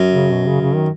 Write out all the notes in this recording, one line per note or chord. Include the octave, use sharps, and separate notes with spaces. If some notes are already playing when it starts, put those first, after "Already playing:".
Already playing: F#2
C#3
B2
C#3
C#3
D#3